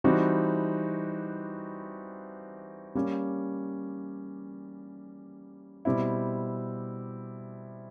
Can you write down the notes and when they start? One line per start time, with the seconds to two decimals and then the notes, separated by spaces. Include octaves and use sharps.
0.04 E3 G3 C4 D#4 F#4
2.95 G3 A#3 C#4
5.85 B2 G3 C4 E4